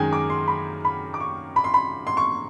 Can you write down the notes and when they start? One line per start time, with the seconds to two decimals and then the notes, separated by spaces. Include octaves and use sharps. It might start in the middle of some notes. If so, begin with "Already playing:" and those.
Already playing: F#2 D#3 G#3 G5 G#5
0.13 D6
0.30 C6
0.48 B5
0.85 B5
1.14 D6
1.20 C#6
1.56 B5
1.64 C6
1.74 B5
2.07 C6
2.17 C#6